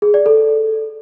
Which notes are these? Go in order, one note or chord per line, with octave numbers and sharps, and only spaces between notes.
G#4
D5
A4